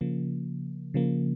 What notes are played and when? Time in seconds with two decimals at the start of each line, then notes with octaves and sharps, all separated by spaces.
0.01 C#3 F3 A#3
0.94 C#3 F3 A#3